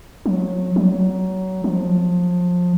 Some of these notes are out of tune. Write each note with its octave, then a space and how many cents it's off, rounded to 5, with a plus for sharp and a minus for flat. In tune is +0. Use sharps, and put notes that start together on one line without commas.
F#3 -25
F#3 +20
F3 +25